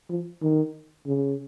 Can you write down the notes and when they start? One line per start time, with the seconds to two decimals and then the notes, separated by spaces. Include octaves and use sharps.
0.10 F3
0.43 D#3
1.06 C#3